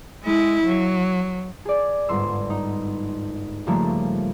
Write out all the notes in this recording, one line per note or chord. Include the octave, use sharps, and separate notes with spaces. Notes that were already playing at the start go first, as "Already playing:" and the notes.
G#3 E4
F#3
G#4 D5
G1 G#2 C6 E6
D#4
C#3 F3 G3 A3 A#3